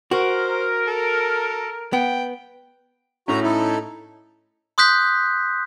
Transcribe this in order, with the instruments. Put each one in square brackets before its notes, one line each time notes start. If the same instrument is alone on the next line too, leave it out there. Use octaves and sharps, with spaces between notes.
[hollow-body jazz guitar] F#4 [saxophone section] A#4 [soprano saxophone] C5
[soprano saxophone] A4
[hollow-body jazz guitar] B3 [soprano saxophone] G5
[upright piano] A2 A3 C#4 [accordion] F#4 A#5
[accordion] D#4 E4 A4
[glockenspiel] C6 D#6 F#6 G6 B6